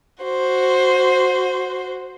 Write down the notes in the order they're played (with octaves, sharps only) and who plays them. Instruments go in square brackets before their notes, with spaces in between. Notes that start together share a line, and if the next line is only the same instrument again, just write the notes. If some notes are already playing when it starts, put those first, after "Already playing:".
[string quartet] F#4 C5